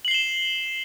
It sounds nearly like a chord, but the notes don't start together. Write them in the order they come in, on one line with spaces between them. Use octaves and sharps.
F#7 C7 G7 E7